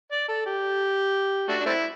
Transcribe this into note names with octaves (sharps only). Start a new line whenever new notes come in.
D5
A4
G4
A3 D4 F#4
D4
A3 C4 E4